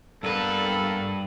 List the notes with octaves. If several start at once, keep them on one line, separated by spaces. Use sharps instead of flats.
G2 A#3 B3 A4 B4